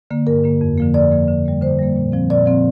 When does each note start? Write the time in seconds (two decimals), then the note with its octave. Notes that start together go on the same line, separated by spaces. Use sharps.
0.11 D3 A#3
0.27 G2 A#4
0.44 D3 A#3
0.61 F2
0.77 D3 F3 A#3
0.94 F2 D5
1.11 D3 F3 A#3
1.28 D3
1.45 G3 A#3
1.62 D3 C5
1.79 G3 A#3
1.96 A#2
2.12 F3 C4
2.30 A#2 D5
2.46 F3 C4